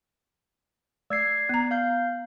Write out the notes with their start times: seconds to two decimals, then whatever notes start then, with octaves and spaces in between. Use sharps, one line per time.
1.10 A3 D5 G#6 C7
1.49 B3 A#5
1.71 F5 G6